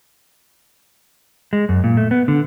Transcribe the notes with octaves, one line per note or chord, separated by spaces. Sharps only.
G#3
F#2
A#2
A3
B3
D3